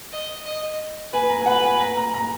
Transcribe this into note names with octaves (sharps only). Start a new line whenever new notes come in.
D#5
D#5
B4 G#5
A#5
G#5
B4 F#5
G#5
A#5
A#5
A#5